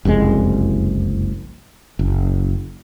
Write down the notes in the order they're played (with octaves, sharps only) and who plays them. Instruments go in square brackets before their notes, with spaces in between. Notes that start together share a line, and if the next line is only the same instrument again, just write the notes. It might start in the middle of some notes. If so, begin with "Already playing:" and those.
[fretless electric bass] F#1 C2 F2 G#3
F#1